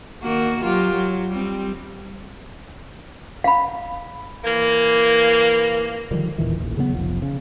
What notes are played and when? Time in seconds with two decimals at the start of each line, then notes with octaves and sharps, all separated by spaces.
0.22 D#3 A#3 F#4
0.62 F#3 F4 G4
0.93 F#3
1.30 G3 C4
3.44 F5 B5
4.44 E3 A#3
6.11 D3 D#3 F3 G3
6.38 E1 A#2 D#3 E3
6.60 A1 D#2
6.77 C#3 F#3 G#3 B3
6.92 F1 B1 F3
7.22 C#3